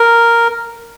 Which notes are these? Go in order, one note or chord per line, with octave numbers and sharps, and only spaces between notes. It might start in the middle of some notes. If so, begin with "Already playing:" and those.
Already playing: A#4